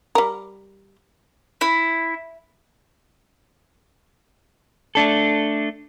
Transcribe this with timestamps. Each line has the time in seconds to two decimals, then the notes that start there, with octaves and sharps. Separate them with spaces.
0.15 G3 A#4
1.61 E4
4.95 A3 D4 A4